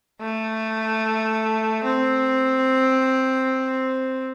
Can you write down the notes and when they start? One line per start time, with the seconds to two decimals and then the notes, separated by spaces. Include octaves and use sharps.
0.20 A3
1.84 C4